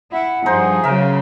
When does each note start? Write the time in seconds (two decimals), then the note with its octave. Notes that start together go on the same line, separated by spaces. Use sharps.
0.12 E4 F#5
0.46 G2 F3 D#4 G#4 C5 C6
0.84 C#3 F#3 A#4 E5